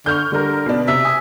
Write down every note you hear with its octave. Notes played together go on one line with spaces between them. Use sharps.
D3 C#6 F6 G6
D3 G3 A#4
B2 B3 D4
C3 E5
G#5 D#6